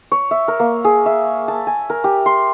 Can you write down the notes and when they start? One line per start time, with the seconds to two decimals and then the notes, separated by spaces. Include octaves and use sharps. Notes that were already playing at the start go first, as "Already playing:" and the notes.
0.12 C#5
0.31 E5
0.48 A#4
0.60 A#3
0.85 G#4
1.06 E5
1.48 A5
1.67 G#5
1.90 A#4
2.04 G4
2.26 C6